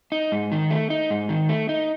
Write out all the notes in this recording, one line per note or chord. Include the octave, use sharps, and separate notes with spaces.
D#4
G#2
D#3
A3
D#4
G#2
D#3
A3
D#4